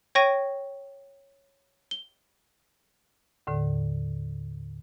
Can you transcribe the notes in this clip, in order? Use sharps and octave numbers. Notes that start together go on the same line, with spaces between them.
C#5 G5 C#6 A#6 D#7
G7
D#2 A2 D3